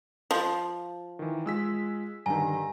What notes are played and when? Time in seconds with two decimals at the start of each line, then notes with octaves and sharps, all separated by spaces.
0.31 F3
1.19 D#3 E3
1.46 G#3 F4 G#4 E6 B6
2.26 G2 D3 D#3 G#5 A#5